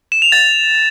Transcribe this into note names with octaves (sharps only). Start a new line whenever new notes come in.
E7
F7
A6